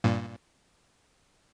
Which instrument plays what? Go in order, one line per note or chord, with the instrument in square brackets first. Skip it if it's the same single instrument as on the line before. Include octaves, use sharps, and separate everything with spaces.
[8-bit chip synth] G2 A#2